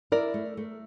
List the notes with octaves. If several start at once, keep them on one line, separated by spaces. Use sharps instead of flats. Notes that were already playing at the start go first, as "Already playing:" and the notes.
E4 A#4 D5
A3
A3